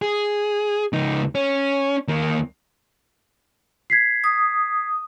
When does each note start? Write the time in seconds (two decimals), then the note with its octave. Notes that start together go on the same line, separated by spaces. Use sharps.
0.02 G#4
0.93 C#2 D#4
1.35 C#4
2.08 D#2 A#3
3.90 G#6 B6 C7
4.24 D#6